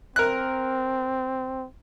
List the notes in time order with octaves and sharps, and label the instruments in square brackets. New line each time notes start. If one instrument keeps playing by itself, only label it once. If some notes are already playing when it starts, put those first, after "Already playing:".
[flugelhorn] C4 [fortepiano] A#4 F#6